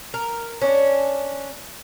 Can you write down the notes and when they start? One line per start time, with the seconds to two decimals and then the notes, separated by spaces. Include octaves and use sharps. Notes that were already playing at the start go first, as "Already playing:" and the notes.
0.14 A#4
0.61 C#4 D4